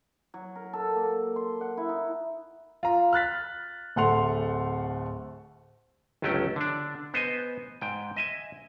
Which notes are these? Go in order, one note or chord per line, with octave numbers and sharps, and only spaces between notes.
F#3
A#4
A4
A#3
C6
F#5
E4
D#4
F4 A#5
F6 F#6 A6 B6
D1 A3 F#5 C6 F7
G1 C#2 F#3 A3 C#4 G5
D3 D4
B3 C5 D#5 G#5
G#2 G5
D#5 E5 G#5